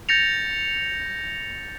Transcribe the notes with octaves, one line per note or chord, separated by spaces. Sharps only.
G6 A6 A#6 C#7 F7